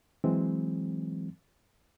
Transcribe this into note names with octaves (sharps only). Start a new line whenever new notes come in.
E3 F#3 G#3 C4